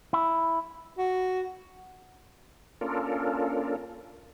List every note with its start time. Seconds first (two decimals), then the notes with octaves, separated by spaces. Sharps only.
0.13 E4
0.98 F#4
2.81 A#3 C#4 D4 F4 A4 A#4